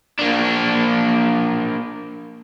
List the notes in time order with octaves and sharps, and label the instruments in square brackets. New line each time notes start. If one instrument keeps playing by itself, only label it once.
[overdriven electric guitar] A#3 D4